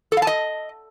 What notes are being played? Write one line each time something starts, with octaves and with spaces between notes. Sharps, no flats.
A4
F5
A5
D#5